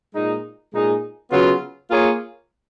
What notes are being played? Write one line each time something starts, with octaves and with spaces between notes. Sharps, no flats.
A#2 G#3 D#4
A#2 G#3 D#4 G#4
C#3 F#3 B3 F4
A#3 F4 G#4 C#5